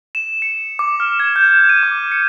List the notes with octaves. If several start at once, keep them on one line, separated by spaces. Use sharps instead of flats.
E7
C#7
D6
F6
G#6
G6
D#7
D6
C#7